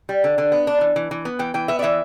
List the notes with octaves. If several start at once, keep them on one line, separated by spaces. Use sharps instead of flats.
G3
D3
D3
B3
D4
E3
E3
E3
B3
E3 G5
E3 G5
B3 E5
D5
E3 E5